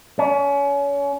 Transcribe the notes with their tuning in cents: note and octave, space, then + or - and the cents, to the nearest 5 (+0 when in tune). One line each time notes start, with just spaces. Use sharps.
C#4 +30